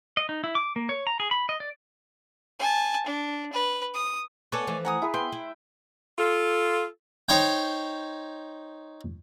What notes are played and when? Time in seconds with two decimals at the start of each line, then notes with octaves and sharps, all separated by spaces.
0.17 D#5
0.29 D#4
0.44 E4
0.55 D6
0.76 A#3
0.89 C#5
1.07 A#5
1.20 G#4
1.31 B5
1.49 D#5
1.60 D5
2.59 G#5 A5
3.06 D4
3.52 B4
3.94 D#6
4.52 B3 A4 C#5 D5 G#5
4.67 E3 F3 A3
4.85 F#5 G#5 A#5 D#6
5.02 E4 G#4 B4
5.14 B3 G5 C6
5.32 E4
6.18 F4 A4
7.29 D#4 C5 C#5 G5